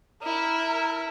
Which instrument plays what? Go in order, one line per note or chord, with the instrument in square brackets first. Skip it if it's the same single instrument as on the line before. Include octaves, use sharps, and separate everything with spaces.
[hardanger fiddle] E4 [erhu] A#4